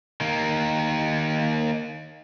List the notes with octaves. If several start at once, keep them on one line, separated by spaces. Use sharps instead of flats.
D#3 A#3